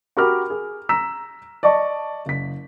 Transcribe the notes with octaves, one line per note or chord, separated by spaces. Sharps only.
F#4 G4 A#4 B5 D6 F6
G#4
A#5 E6 B6 E7
D5 D#5 A5 C#6
F#1 B6